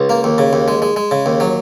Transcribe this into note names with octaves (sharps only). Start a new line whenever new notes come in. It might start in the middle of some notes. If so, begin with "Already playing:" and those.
Already playing: C#2
A#3
D#2
C#3
D#2
G#3
G#3
G#3
C#3
D#2
F#3